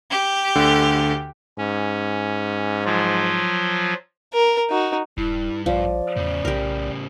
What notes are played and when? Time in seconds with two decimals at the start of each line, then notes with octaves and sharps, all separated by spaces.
0.10 G4
0.55 D2 D3
1.58 G#2 C#4
2.85 F3 F#3 F4
4.33 A#4
4.70 D#4 F#4
5.17 D#1 G2 E4
5.66 A#1 F3 D5
6.16 E2 A2 C#3
6.45 B1 G4 A#4